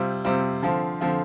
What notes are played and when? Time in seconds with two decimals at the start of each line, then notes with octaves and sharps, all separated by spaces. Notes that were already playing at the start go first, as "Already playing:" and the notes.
Already playing: C3 G3 C4 F4
0.24 C3 G3 C4 F4
0.62 D3 F3 C4 F4
1.01 D3 F3 C4 F4